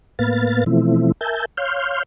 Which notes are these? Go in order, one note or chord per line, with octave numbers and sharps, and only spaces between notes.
A2 A#3 B3 B4 F5 A6
B2 E3 F3 A3 C4 E4
A#4 E5 G#5 A5 G6
C#5 F5 C6 F6 G6